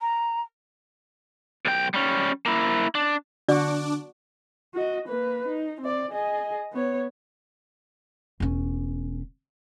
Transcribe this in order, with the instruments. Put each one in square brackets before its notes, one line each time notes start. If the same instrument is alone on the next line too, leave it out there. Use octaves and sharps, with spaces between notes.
[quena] A#5
[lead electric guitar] B1 G5
G3 C#4
A#3 E4
D4
[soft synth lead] D3 [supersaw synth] D4 D6 [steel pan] F#4 [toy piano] D5
[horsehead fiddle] F#4 D#5
A#3 B4
D#4
C4 D5
G#4 D#5
B3 C#5
[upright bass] E1 C#4